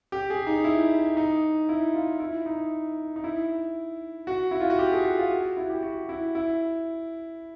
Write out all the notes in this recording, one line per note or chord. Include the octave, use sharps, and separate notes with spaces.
G4
G#4
D#4
E4
D#4
E4
F4
E4
D#4
D#4
E4
F#4
E4
F4
F#4
G4
G#4
F#4
F4
F#4
E4
G4
F#4
E4
E4